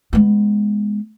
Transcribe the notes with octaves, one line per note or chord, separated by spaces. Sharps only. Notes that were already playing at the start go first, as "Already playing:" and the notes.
G#3 B3